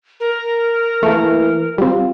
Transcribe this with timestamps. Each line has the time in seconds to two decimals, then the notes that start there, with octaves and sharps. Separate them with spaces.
0.20 A#4
1.03 E3 A3 A#3
1.78 G3 C4 F4